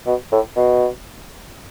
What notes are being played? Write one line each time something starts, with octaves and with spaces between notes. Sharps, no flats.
B2
A2
B2